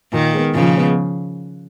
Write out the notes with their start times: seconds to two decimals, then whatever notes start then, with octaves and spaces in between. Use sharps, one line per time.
0.13 A#2 D#3
0.34 G#3 B3
0.54 A#2 C#3 F3
0.75 G#3 B3